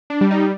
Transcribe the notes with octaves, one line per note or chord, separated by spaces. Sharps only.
D4
G3
D#4